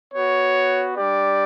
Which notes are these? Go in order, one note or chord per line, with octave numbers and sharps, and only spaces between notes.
B3 F#4 C#5
G3 D4 G4 D5